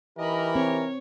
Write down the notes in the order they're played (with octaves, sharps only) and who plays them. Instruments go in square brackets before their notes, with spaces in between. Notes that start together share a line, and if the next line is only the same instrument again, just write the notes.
[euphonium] E3 [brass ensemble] D#4 G4 A#4 [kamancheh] D#5 B5
[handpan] C4 [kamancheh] C#5